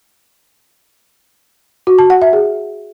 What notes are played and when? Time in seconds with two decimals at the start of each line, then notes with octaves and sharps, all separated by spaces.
1.87 F#4
1.98 A5
2.10 F#5
2.22 E5
2.33 G#4